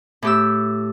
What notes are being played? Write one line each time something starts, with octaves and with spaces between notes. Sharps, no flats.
A2 G4 E6